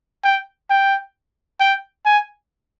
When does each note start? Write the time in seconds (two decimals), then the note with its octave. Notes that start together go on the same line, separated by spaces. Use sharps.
0.24 G5
0.70 G5
1.60 G5
2.05 G#5